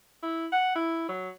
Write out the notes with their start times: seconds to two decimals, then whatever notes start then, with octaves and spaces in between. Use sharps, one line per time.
0.23 E4
0.52 F#5
0.75 E4
1.09 F#3